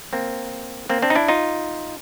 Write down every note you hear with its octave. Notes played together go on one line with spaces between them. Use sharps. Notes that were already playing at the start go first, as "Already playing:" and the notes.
A#3 C4
A#3 C4
C4 D4
D#4
D4 E4
D#4 F4